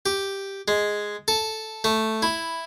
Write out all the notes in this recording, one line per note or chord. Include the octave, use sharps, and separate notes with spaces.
G4
G#3
A4
A3
E4